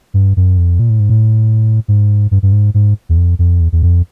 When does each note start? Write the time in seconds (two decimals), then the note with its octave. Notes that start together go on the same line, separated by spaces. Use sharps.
0.14 G2
0.37 F#2
0.58 F2
0.79 A#2
0.90 A2
1.00 G#2
1.09 A2
1.88 G#2
2.31 G2
2.43 G2
2.52 G#2
2.74 G#2
3.09 E2
3.17 F2
3.39 F2
3.61 E2
3.72 E2
3.83 F2